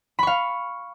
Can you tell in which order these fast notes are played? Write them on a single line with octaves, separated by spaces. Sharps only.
B5 C#6 F5